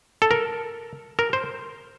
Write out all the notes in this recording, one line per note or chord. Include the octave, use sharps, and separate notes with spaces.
A4
A#4
A#4
C5